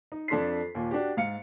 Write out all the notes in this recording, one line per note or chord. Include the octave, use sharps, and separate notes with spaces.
D#4
F2 D4 A4 C6 B6 C7
D#2 A#2
D4 F#4 G4
G#2 F5 C#7